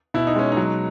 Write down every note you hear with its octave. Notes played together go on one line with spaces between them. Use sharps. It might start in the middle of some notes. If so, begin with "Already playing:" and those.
B2 E4
D#4
G#3 C#4
D#4
F#3